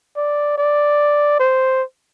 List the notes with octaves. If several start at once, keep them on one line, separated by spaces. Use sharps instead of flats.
D5
D5
C5